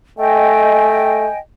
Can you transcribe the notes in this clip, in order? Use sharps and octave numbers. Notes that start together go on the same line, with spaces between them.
A3 D#5 G5 G#5